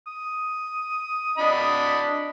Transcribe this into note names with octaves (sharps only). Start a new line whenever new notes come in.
D#6
D4 D#5 B5